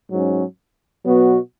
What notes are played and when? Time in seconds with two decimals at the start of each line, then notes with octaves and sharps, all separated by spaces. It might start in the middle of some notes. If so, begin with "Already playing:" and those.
0.09 G#2 F#3 C#4
1.04 B2 F#3 B3 F#4